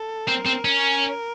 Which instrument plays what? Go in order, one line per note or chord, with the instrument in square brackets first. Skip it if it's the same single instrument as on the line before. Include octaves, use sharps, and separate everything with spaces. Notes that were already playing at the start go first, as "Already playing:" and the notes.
Already playing: [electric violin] A4
[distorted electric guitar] C4 [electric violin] A#4
[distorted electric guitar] C4
C#4